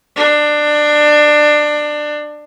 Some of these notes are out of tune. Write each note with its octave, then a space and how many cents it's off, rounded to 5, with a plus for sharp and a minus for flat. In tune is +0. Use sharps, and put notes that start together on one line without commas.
D4 +20